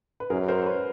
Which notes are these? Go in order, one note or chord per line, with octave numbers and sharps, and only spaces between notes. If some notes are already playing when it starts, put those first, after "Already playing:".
B4
F#2 G#4 A#4
A#4 C5
C5
B4 C#5